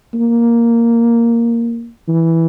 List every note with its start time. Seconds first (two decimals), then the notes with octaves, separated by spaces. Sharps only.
0.14 A#3
2.08 E3